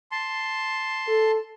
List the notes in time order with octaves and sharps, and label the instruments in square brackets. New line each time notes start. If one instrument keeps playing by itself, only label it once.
[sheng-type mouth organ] A5 C6
[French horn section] A4